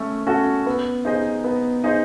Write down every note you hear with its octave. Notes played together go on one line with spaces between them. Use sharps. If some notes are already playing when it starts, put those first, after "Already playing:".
Already playing: A3 C#4
C#4 F#4 A4
B3
D#4 G#4 C5 D#5
B3
D#4 G#4 C5 D#5